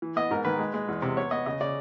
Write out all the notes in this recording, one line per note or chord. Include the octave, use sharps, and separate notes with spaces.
E3
B3 D#5
G#2 A#4
D#3 B4
G#3
G#3
E2
C3
B3 C#5
B3 D#5
C#3 D#5
C#3 D5